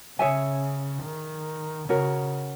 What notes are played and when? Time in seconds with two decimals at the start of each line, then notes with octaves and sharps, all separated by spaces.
0.19 C#3 G#4 C#5 E5 G#5
1.04 D#3
1.89 C#3 C#4 F#4 A#4